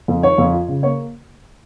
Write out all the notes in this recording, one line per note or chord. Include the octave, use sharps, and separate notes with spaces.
F2
D#3 C#5
F2
F4
C#3
A#3 C#5